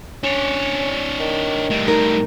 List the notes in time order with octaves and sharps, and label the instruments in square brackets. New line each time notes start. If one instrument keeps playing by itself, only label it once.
[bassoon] C#4 [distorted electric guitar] D4 C#5
[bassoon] D#3
[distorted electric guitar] A2 G3
[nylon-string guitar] D#4 A#4